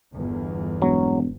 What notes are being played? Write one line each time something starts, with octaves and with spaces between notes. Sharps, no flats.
G1 E2
E1 F#3